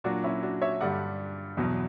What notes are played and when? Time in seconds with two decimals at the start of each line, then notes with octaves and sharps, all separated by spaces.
0.04 A#2 F#3 D4 F#4
0.24 C#4 E4
0.43 D4 F#4
0.62 C#5 E5
0.81 G2 D3 G3 D5 F#5
1.57 E2 B2 F#3